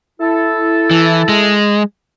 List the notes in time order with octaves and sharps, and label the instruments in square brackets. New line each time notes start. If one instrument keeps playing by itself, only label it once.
[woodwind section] E4 A4
[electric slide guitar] E3
G#3